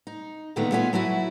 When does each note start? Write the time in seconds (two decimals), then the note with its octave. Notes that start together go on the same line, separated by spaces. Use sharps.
0.07 D#4
0.56 A#2 D3 D#3 G#3 A3 B3
0.72 B3 F4 C#5 E5 G#5
0.93 F#3 A3 E4 F#4